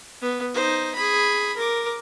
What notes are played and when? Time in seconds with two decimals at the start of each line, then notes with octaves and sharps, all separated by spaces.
0.21 B3
0.54 D#4 C5
0.95 G#4 B5
1.56 A#4 D6